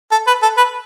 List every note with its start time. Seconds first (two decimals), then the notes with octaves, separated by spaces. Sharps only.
0.12 A4
0.27 B4
0.43 A4
0.57 B4